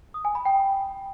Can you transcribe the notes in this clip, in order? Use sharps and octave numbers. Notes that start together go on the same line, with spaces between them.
D#6
G#5
B5
G5